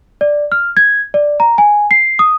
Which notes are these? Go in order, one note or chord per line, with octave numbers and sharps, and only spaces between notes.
D5
F6
G#6
D5
A#5
G#5
C7
D#6